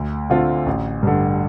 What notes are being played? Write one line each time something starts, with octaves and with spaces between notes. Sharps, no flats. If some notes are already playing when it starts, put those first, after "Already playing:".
Already playing: D2
D3 A3 C4 F4
A1
G2 D3